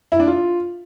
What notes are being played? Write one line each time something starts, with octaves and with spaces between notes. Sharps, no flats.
E4
D4
F4